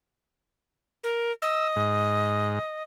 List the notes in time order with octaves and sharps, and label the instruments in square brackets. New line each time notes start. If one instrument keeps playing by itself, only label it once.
[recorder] A#4
[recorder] D#5 [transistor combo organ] E6
[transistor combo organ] G#2